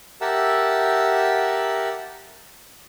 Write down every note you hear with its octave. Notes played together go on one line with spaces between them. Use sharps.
G4 A#4 E5 F#5 A5 E6